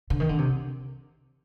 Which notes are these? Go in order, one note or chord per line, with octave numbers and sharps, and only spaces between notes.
D3
D#3
D3
C3